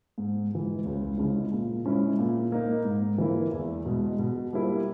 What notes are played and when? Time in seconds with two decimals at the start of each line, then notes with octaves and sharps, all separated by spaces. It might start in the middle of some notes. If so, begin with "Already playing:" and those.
0.18 G#2
0.51 E3 G#3
0.85 C#2
1.18 C#3 G#3 C#4 E4
1.52 A#2
1.86 G#3 C#4 E4
2.19 A#2
2.52 A#3 D#4
2.85 G#2
3.18 E3 A#3 E4
3.53 E2
3.85 B2 G#3
4.19 B2
4.53 G3 A#3 E4